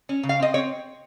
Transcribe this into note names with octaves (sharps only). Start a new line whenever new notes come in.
C#4
C#3
F5
C4 D#5
C4 C#5